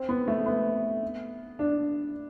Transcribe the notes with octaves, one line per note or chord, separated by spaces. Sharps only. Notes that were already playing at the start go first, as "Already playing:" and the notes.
Already playing: C4
B3
A3
B3
D4